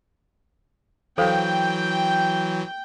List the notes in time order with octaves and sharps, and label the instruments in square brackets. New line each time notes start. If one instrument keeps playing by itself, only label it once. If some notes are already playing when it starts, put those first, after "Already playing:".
[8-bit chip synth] E3 F#3 [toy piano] A4 C5 F5 [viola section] G5